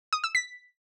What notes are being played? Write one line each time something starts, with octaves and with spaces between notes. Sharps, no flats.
D#6
E6
B6